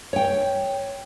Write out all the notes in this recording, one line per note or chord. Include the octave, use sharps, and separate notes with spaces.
C#5 G5